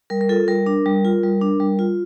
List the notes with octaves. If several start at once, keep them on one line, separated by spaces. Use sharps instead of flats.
G3 A#4
A#4
F4 A4
G3 A#4
D4
G3
F4
G3
D4
G3
F4